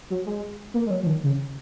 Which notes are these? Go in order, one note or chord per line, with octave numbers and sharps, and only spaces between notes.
F#3
G#3
A#3
G#3
F#3
F3
D#3
C#3